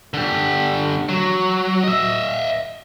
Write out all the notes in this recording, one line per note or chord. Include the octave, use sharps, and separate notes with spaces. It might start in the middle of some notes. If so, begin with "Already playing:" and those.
D3 G4
F#3
D#5 E5